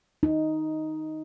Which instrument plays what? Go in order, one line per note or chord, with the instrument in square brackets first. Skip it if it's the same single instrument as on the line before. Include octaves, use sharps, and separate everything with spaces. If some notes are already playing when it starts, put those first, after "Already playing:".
[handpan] D#4